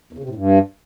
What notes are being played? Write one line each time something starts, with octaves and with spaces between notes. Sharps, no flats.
E2
C#3
C3
A2
G2